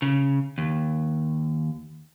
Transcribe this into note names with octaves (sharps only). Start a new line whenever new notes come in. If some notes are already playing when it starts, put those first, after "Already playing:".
C#3
D#2